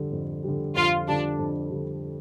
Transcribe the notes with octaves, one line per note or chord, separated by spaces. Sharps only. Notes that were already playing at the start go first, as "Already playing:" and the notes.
Already playing: F2 D3 G3
F2
D3 G3
F2 F4
D3 G3 D4
F2
D3 G3